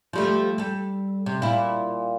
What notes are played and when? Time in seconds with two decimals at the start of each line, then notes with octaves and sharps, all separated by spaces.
0.13 F3 G3 A3
0.58 G3 A4
1.26 C3
1.42 A#2 E4